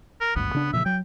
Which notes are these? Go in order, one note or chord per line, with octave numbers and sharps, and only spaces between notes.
A#4
G#1 D2 G2 B3
C#3 D4
A#2 C#3 F3 E5
F#3 G5